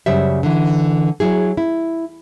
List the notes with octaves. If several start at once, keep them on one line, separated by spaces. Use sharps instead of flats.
F#2 C#3 G3 C5 E5
D3 E3
F#3 E4 G#4
E4